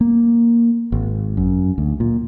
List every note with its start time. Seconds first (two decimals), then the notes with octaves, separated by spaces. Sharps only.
0.01 A#3
0.92 G#1
1.37 F#2
1.78 D2
2.00 A#2